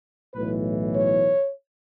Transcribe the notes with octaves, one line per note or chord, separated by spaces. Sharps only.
B1 A2 E3 B4
C#5